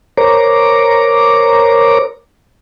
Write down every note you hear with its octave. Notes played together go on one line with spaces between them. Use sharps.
A#4 C5 C#5 A#5 D6